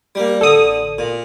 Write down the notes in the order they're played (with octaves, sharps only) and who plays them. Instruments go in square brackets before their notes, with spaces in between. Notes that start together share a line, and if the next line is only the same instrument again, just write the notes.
[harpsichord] G3 A#3
[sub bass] A1 [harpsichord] D3 [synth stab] A4 D#6
[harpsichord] A#2